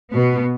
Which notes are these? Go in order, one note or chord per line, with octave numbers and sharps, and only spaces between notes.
B2 B3